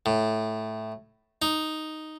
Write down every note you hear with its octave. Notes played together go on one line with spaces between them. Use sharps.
A2
D#4